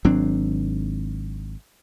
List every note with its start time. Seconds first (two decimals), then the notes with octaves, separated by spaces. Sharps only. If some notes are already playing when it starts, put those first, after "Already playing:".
0.05 G#1 F#3 C4 D4